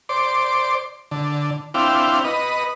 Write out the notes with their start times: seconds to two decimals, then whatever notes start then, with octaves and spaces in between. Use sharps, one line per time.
0.09 C5 D5
1.11 D3
1.74 C4 D4 E4 F5 G5
2.25 B4 D#5